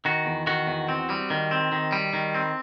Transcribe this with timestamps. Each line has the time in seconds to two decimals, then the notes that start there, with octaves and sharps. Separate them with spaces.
0.05 D#3 F#4
0.26 E2
0.47 D#3 F#4
0.67 E2
0.89 C4
1.10 G3
1.30 D#3
1.51 C4
1.72 D#3
1.93 G3
2.13 D#3
2.35 C4